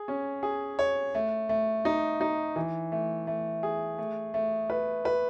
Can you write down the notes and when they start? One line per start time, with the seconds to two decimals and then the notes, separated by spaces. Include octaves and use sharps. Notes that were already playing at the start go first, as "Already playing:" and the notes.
Already playing: G#4
0.08 C#4
0.43 G#4
0.79 C#5
1.15 A3
1.49 A3
1.85 D#4
2.21 D#4
2.56 E3
2.92 A3
3.27 A3
3.63 G#4
3.98 A3
4.34 A3
4.70 B4
5.05 B4